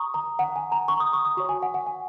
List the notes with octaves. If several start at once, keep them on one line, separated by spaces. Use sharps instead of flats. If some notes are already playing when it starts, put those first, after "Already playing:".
Already playing: A#5 C#6 D#6
A#5
F#5
G#5
A#5
C#6
D#6
C#6
D#6
F#4 C#5 C#6
G#5
F#5
F#5
G#5